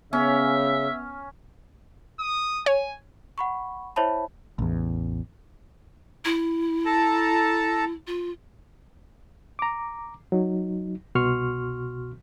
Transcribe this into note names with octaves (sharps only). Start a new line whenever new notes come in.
C#3 B3 C#4 E5
D#6
C#5 G#5
F#5 B5 C#6
E4 C5 C#5 E5 A5 B5
A1 E2
E4
A4 A5 A#5
F4
A#5 D6
F#3 D#4
C2 B2 F#4 C6 C#6 F6